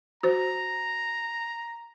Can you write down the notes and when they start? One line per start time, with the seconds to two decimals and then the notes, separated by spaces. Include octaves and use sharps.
0.23 F#4 C5 A#5